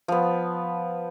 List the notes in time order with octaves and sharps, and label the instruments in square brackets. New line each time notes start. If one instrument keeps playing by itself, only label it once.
[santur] F3 B3